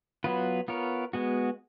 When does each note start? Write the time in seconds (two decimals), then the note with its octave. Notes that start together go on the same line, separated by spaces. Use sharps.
0.24 F#3 B3 F4 B4
0.68 B3 F4 A#4 C#5
1.13 G#3 B3 F#4